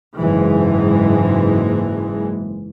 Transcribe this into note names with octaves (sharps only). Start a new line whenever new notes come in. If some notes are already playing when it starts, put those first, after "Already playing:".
F#1 G#2 E3 G#3